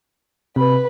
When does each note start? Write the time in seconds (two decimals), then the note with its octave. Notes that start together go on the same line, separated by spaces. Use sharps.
0.56 C3 B4 B5